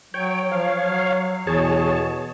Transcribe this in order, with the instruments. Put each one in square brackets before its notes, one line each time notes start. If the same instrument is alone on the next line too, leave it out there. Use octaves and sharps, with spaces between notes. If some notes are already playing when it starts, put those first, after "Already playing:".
[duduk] F#3 [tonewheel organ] C#5 G5
[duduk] F3 [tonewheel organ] C#5 F5
[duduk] F#3
[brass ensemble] E2 [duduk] B2 [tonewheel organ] G#4 C#5 A5